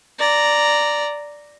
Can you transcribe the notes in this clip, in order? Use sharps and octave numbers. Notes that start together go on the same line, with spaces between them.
D5 A#5